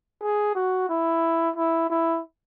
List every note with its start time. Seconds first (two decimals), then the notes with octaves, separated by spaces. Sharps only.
0.22 G#4
0.55 F#4
0.89 E4
1.56 E4
1.90 E4